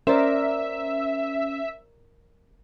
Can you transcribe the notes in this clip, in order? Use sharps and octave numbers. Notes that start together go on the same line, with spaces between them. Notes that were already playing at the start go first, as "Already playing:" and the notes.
C#4 A#4 C5 D5 E5